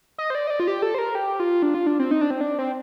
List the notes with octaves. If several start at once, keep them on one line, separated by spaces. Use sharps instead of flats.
D#5
C5
D5
D#5
D5
F4
G4
A4
C5
A#4
G4
F4
D4
F4
D4
C4
D#4
D4
C4
D4
C4